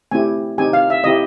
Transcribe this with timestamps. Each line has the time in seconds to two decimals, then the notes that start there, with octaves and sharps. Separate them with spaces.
0.11 A3 C4 E4 G4 G#5
0.58 C4 D#4 G4 G#5
0.73 F5
0.90 E5
1.04 C4 E4 G4 D#5